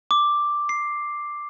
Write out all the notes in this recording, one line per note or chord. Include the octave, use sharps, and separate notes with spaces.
D6
C7